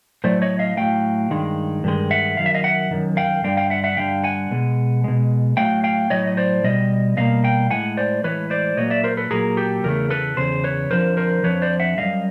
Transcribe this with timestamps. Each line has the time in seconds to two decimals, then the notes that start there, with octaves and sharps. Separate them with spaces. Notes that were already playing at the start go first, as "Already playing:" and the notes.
0.24 A2 F#3 A3 C5 D5
0.42 C#5 D#5
0.59 D#5 F5
0.77 A2 F#3 A3 F5 G5
1.30 G2 D#3 G#3
1.84 G2 D#3 G#3
2.11 E5 F#5
2.37 F#2 D#3 F5
2.46 E5
2.54 D#5 F5
2.64 E5 F#5
2.91 F#2 D#3
3.17 F5 G5
3.44 G2 D3 G3 F5 G5
3.57 F5 G5
3.70 E5 F#5
3.84 E5 F#5
3.97 G2 D3 G3 F5 G5
4.24 F#5 G#5
4.51 B2 G#3
5.04 B2 G#3
5.57 A2 F#3 A3 F5 G5
5.84 F5 G5
6.10 A2 F#3 A3 C#5 D#5
6.27 D#5
6.37 C5 D5
6.64 B2 G3 D#5
7.17 B2 G3 A#3 D#5 F5
7.44 F5 G5
7.70 A2 E3 G#3 F#5 G#5
7.97 C5 D5
8.24 A2 E3 G#3 B4 C#5
8.50 C5 D5
8.77 A#2 F#3 A#3 C#5 D#5
8.90 D5 E5
9.04 A#4 C5
9.17 A4 B4
9.31 A#2 F#3 A#3 G#4 A#4
9.57 G4 A4
9.84 E2 C#3 A3 A#4
10.10 A4 B4
10.37 E2 C#3 C5
10.64 B4 C#5
10.91 F2 D3 F3 A#4 C5
11.17 A#4 C5
11.44 F2 D3 F3 B4 C#5
11.62 C5 D5
11.80 E5 F#5
11.98 F#2 D#3 G3 D#5 F5